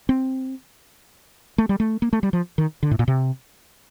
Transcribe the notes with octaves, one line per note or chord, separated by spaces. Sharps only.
C4
A3
G3
A3
A#3
A3
G3
F3
D#3
D3
A2
A#2
C3